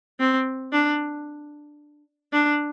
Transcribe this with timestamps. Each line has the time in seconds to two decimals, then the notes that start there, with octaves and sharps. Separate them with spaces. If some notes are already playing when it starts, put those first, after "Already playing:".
0.20 C4
0.72 D4
2.33 D4